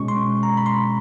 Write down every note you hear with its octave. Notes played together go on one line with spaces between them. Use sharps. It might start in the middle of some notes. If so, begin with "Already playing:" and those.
Already playing: B2 G#3 C#4 C#6
C6
A#5
B5
C6